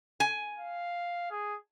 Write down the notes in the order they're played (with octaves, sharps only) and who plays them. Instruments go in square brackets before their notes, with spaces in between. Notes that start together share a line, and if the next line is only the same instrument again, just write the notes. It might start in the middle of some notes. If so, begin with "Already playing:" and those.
[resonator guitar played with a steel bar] G#5
[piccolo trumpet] F5
G#4